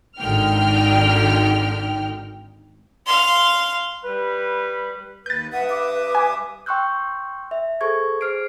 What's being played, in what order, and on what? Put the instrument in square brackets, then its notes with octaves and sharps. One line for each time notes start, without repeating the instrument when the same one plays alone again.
[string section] G#1 D3 D#4 G5 F6
[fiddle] F5 C6
[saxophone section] G3 B4
[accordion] D#2 B4 [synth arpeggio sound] G6 A6
[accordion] G2 E5 D#6 [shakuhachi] B4 [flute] F#5
[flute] D6
[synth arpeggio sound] G#5
[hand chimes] G5 C6 C#6 E6 F#6 G6
E5
G#4 A4 C5 C#6 G#6
G#4 C5 F6 C7 D7